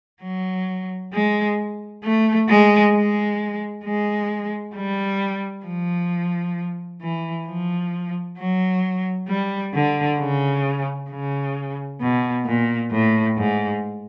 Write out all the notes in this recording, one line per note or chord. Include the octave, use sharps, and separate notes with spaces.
F#3
G#3
A3
G#3
G#3
G#3
G3
F3
E3
F3
F#3
G3
D3
C#3
C#3
B2
A#2
A2
G#2